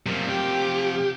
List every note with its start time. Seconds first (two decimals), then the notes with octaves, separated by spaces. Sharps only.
0.06 C3 F3 F#3 A#3
0.29 G4